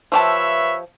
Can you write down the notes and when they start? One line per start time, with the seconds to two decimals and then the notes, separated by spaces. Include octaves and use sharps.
0.12 F3 G4 B4 C#5 E5 A5